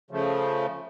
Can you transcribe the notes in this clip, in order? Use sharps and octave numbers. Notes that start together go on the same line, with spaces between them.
C#3 F3 A3